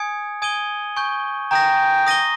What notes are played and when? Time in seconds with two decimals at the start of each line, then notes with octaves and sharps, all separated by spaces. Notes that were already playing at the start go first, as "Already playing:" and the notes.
Already playing: G#5 D#6 G#6 C#7
0.42 G#5 D#6 G#6 D#7 G7
0.96 G#5 C#6 G6
1.51 G5 A#5 D#6 A#6
2.07 D#6 A#6 D#7 G7